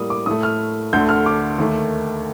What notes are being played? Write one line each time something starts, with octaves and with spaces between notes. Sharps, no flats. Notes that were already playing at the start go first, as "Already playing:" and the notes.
Already playing: A2 G3 A#3 D#6
D6
A2 A3 D#6
F6
D2 D3 A3 G6
F6
D6
D#2 D#3 A3